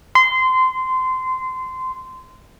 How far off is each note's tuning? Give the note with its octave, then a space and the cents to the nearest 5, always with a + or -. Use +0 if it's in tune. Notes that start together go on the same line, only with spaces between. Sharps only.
C6 -20